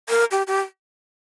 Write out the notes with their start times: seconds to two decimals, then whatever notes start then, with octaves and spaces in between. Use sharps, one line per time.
0.09 A#4
0.31 G4
0.47 G4